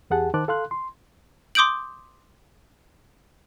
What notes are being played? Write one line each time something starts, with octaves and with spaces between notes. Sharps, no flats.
E2 G4 G#4 F#5 A5
D#3 C5 A5 D6 F#6
A4 F5 C6 F#6
C6
C6 D6 D#6 G6 D7 F#7